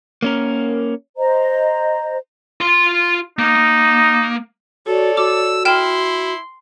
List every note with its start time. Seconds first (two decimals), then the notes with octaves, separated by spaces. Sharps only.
0.22 A#3 C#4 A#4
1.17 C5 D#5 A#5
2.61 F4 C6
3.39 A#3 D#4
4.87 F#4 A4 C#5 D5
5.17 F#4 D6 E6
5.65 E4 G5 C6 F6 E7